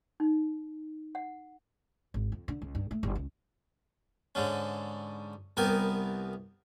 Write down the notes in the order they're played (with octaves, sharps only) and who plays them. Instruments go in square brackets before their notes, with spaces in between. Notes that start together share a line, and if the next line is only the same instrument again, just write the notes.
[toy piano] D#4
F#5
[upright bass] G#1
F2
D3
C#2
G2
A3
G1
C#2
[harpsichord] G#2 D3 C#4
C2 B3 A#4 G5 G#5